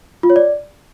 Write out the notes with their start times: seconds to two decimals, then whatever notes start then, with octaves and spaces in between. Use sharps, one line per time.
0.23 F4
0.30 C#5
0.36 D5